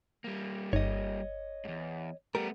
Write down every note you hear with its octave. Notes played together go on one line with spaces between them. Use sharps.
G3 A#3
G1 C#5 D#5
E2 G#2
G3 A3 B3 G4 A#4